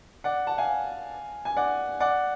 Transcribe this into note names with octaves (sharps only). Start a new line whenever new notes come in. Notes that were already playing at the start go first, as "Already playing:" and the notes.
D5 F#5
F#5 A5
F5 G#5
G#5
D5 F#5
D5 F#5